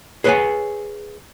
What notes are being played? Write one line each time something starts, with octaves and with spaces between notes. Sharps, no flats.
G#4 B4 C#5 D5 F#5 G#5